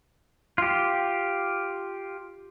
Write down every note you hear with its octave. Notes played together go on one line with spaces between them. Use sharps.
F4 G4